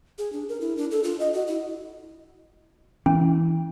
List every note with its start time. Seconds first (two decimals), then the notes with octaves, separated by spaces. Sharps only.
0.18 G#4
0.33 D4
0.49 A#4
0.61 E4
0.77 D4
0.91 A4
1.04 F4
1.20 D#5
1.33 F#4
1.47 E4
3.06 E3 C#4